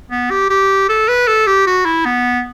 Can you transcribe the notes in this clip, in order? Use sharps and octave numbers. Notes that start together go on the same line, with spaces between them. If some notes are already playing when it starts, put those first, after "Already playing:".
B3
G4
G4
A4
B4
A4
G4
F#4
E4
B3